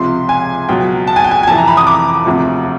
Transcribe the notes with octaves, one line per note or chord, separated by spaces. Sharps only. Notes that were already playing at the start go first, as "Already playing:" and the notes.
Already playing: C#2 C3 F3 C6
G#5
C#2 B2 F#3 G5
A5
G#5
G5
G#5
G#5
F2 C3 E3 A5
A#5
B5
D#6
D6
E1 D2 C3 F3